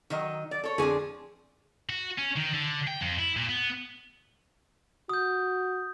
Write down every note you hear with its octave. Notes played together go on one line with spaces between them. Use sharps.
D#3 F#3 D#5
D5
A4 C#5
D3 F3 C4 G#4 G#5
F#4
C#4
D#3
D3
G5
F2
E4
A#2
B3
F#4 D#6 G6